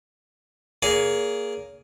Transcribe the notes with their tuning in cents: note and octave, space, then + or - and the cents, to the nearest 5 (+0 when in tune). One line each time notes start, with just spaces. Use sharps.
A#3 +0 G#4 +0 C#5 +35